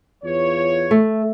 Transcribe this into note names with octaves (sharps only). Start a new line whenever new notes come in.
E2 F4 C#5
A3